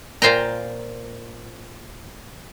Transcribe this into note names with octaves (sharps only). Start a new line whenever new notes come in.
A#2 F4 C5 G5 A#5